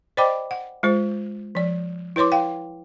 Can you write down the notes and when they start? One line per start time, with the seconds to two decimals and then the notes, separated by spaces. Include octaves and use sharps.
0.17 C5 D5 D#5 G5 B5 D6
0.51 F#5
0.83 G#3 F4 C5
1.55 F3 D5
2.16 E4 B4 C#5 C6 D6
2.32 F5 G5